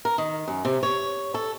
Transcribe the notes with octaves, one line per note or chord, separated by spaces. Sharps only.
A#4
D#3
F#2
C3
C#5
A4